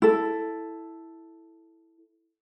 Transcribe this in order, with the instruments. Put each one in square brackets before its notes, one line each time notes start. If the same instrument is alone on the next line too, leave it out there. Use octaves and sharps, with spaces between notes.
[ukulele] E4 A4